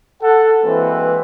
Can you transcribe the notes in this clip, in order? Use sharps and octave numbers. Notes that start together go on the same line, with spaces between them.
A4 F#5
E3 G#3 A#3 C4 F#4 B4